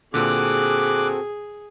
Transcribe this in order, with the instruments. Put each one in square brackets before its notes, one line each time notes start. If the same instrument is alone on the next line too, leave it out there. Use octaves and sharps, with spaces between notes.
[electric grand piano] A#2 D3 [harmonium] C4 F#4 A4 [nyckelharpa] G#4 [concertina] D6 F#6